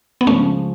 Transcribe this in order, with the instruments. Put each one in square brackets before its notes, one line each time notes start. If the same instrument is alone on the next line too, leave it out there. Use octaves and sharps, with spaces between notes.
[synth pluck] B3
[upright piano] C#2 C#3 F3 G#3 D4 [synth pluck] A3 C#4